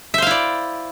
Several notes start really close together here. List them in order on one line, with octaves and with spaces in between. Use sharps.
E5 C5 F5 E4 D5